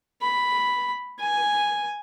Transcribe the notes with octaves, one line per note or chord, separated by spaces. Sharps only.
B5
G#5